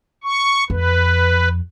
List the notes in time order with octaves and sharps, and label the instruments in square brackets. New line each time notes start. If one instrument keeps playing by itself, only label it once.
[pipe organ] C#6
[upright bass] F2 [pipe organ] B4